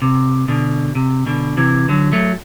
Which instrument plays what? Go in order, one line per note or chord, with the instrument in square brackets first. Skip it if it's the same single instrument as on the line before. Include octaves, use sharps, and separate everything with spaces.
[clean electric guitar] C3
B2 D3
C3
B2 D3
C3 E3
D3 F#3
F#3 A3